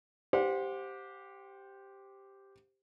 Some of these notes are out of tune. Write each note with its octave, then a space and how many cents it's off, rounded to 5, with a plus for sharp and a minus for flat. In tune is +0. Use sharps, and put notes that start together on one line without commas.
G4 +0 C5 +0 F#5 -35